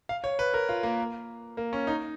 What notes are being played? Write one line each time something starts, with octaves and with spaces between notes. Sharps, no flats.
F5
C#5
B4
A#4
F4
A#3
A#3
C#4
D#4